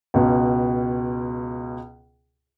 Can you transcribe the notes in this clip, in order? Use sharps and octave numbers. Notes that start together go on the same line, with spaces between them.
C#2 B2